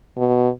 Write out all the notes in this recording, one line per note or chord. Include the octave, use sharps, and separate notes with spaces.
B2